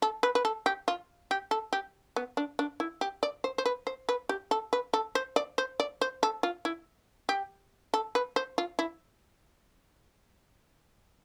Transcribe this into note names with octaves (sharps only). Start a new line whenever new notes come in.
A4
B4
B4
A4
G4
F4
G4
A4
G4
B3
D4
D4
E4
G4
D5
C5
C5
B4
C5
B4
G4
A4
B4
A4
C5
D5
C5
D5
C5
A4
F4
E4
G4
A4
B4
C5
F4
E4